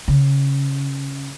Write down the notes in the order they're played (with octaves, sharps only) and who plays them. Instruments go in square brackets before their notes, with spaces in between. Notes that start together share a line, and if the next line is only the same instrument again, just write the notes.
[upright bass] C#3